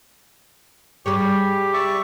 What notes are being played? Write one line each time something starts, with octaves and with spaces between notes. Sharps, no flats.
G3 G4 G#4 C#5
D5 E5 C#6